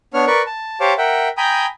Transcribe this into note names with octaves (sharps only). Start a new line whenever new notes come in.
B3 D4 C#5 F6
A#4 B4 D5 C#6
A5
G4 C5 C#5 F5 A5 D6
A#4 E5 F#5 G5
G5 G#5 A#5 B5 D#6 G6